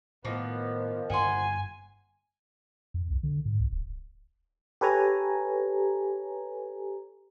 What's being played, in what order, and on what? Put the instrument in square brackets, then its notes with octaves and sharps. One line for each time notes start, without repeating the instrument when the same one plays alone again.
[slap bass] A2 [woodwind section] D#3 F3 [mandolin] A#3 [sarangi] B3
[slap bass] G1 G2 A#3 [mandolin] F#5 C6 [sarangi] G#5
[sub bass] F2
C2
D3
G#2
C2
D1
[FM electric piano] G4 A4 B4 C#5 G#5 A#5